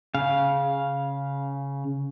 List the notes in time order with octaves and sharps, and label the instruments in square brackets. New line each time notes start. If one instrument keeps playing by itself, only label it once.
[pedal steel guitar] C#3 F5